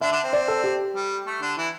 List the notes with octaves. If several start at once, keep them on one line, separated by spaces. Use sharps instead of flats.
D3 D4 E5
D3 D4
C4
D5
A4
G4
G3
A3
D3 D4
E3 E4